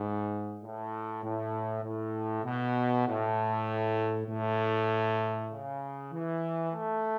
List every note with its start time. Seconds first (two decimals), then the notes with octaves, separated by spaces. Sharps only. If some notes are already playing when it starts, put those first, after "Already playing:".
Already playing: G#2
0.62 A2
1.23 A2
1.83 A2
2.44 B2
3.07 A2
4.28 A2
5.51 C#3
6.13 E3
6.73 A3